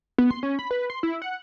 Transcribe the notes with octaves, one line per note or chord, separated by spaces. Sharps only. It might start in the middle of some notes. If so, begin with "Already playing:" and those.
B3
C6
C#4
B5
B4
C6
E4
F#5